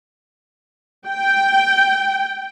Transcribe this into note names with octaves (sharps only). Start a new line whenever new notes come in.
G5